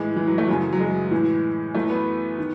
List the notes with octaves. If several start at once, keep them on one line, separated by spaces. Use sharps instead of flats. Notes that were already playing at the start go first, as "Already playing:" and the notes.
Already playing: A2 E3 G#3
E3
F#3
A3
F#2 C#3 E3 F#3
F#3
G#3
A2 E3
F#2 E3 A3
B3
D#3